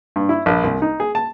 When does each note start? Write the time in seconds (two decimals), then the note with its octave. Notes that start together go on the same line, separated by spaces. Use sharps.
0.16 G2
0.29 E4
0.46 A#1
0.64 C2
0.82 D#4
1.00 G#4
1.15 A5